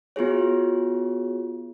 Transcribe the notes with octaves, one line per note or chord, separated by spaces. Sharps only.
B3 F4 F#4 G#4 C#5